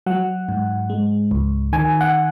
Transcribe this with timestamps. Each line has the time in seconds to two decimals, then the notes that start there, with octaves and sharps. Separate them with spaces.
0.06 F#3 F#5
0.49 G#2
0.90 G#3
1.31 C#2
1.73 D#3 G#5
2.01 F#5